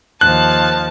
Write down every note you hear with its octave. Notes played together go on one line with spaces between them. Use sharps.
D#2 F3 A5 F#6